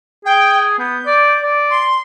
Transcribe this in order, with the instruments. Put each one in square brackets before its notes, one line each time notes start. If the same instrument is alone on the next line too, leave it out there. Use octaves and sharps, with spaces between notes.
[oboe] G#4 [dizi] G5
[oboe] B3 [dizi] G6
[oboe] D5
D5
[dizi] C6